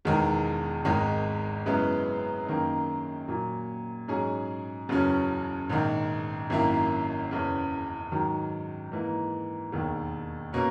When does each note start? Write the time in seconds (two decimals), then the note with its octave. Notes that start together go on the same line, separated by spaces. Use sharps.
0.05 E1 E2 D#3 G#3
0.85 G#1 G#2 D#3 G#3 D#4
1.66 F#2 C#3 G#3 B3 E4
2.46 F#2 D#3 A#3 D#4
3.28 A#2 F#3 A#3
4.08 G#2 F#3 C#4 G#4
4.89 F#1 E2 C#3 F#3 C#4
5.69 A#1 G#2 D#3
6.50 G#1 F#2 D#3 A#3 E4
7.31 F#1 E2 C#3
8.12 G#2 D#3 F#3
8.92 G#2 E3 A#3
9.72 E1 D#2 D#3
10.53 B2 A#3 C#4